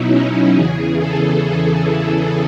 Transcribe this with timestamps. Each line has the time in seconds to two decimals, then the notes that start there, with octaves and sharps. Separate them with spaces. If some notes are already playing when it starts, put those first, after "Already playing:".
Already playing: B2 F#3 D#4 E4
0.09 C#4
0.54 E2 C#3 E3 G#4
0.99 A4